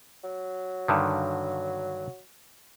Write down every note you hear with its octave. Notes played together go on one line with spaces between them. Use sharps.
F#3
G2 D3 D#3